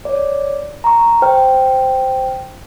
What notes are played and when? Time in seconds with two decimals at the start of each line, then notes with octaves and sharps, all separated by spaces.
0.05 C#5 D5
0.84 A#5 C#6
1.22 C5 G5 F6